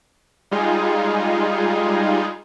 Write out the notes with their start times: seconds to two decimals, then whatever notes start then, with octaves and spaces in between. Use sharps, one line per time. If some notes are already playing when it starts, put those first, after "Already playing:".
0.51 G3 G#3 D#4 F4 G#4